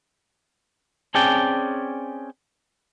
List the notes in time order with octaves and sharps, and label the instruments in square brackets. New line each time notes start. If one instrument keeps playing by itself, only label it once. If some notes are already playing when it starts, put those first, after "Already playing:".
[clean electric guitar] C4 C#4 G#4 D5 G5 A5